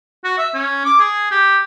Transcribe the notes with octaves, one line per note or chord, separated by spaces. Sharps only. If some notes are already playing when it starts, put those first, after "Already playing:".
F#4
E5
C#4
D6
G#4
G4